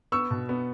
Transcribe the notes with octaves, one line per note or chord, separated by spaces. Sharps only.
B3 C#6 E6
B2
B3